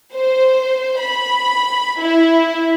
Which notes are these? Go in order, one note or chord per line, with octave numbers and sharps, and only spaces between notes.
C5
B5
E4